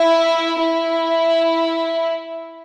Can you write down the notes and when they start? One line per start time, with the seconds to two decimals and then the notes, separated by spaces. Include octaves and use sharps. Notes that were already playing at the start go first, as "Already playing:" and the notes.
Already playing: E4
0.58 E4